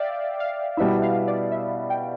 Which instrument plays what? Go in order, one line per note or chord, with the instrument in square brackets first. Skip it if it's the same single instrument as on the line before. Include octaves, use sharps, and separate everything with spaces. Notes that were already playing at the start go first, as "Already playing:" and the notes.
Already playing: [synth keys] D5 E5 F5 G5
F5
[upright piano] B2 G3 B3 E4 [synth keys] E5
[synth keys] F5
D5
E5
G5